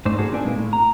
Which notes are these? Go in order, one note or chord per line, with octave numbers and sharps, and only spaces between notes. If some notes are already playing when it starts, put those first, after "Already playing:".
G#2 A3 D#4 C5 D5
A#3 F#4 G#4 A4 D5
C4 D4 D#4 B4 D5 G#5
A#2 G#3 A#3
A2
A#5